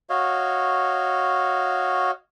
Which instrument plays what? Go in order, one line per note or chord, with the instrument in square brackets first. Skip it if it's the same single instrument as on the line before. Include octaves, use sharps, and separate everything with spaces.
[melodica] F#4 C#5 D#5 F5